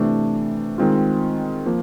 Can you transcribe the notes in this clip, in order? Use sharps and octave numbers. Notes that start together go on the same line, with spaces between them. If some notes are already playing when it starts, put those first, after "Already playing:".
Already playing: C3 E3 A3 D4
D#3 G#3 C4 F4
F3 A#3